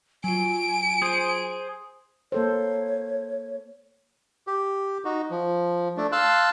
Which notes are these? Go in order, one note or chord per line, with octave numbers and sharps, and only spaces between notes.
F#3 F4 G#5 D7
G#4 C5
A#3 A4 C5 C#5
G4
D#4 F#4
F3
A3 D4
F5 A5 C6 E6 F#6